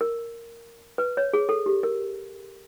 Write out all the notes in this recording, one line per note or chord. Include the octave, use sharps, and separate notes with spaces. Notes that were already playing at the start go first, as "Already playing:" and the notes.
A#4
B4
C#5
G#4
A4
G4
A#4